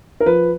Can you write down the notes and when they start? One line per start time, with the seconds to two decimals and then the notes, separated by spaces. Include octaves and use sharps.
0.20 A#4
0.26 F3 B4